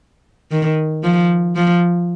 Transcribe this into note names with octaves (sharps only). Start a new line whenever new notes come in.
D#3
F3
F3